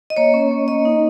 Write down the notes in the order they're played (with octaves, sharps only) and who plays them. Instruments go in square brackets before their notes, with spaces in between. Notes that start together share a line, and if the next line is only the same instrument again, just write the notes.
[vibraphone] D#5
A#3 C#5
C#4
A#3
A#3 D#5
D#4